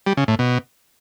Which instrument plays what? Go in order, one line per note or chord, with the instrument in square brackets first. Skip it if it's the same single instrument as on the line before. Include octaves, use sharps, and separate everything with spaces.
[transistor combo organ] G3
C#3
A2
B2